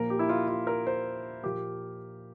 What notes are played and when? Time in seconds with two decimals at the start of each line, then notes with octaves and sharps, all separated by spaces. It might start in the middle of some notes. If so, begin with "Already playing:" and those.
Already playing: A#2 F3 A#3 A#4
0.10 G4
0.19 E4
0.29 F4
0.48 F4
0.67 A#4
0.87 C5
1.43 A#2 F3 A#3 G4